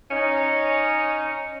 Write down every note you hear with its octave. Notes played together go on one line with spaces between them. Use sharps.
C#4 D#4